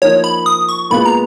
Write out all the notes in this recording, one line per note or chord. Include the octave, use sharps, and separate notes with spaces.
F3 A#3 D#4 C#5
B5
D#6
C#6
A#2 G#3 B3 F4 B4 B5
A#5